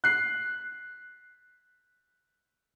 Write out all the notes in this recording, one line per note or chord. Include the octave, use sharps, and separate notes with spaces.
F#6 C7